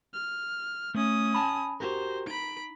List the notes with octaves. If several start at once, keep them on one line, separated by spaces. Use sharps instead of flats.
F6
A3 C#4 D#6
G#5 A5 B5
F#4 G4 A#4 C5
D#4 B5 D7